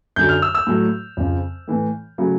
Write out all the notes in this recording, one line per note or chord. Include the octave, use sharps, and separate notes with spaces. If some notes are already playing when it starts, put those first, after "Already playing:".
F#2 D3 F#3 G6
F6
E6
E6
A2 F#3 A3
F2 C#3 F3
A2 E3 A3
C#3 F#3 A3